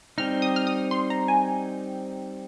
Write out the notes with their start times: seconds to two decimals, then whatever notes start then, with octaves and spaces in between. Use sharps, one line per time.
0.18 G3 C4 D#4 F6
0.42 D#6
0.56 F6
0.67 D#6
0.91 C6
1.10 A#5
1.28 G#5